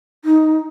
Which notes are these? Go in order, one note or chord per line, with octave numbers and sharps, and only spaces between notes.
D#4